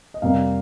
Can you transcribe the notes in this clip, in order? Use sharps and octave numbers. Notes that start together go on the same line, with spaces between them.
D#5
F2 C3 G3 A#3 F5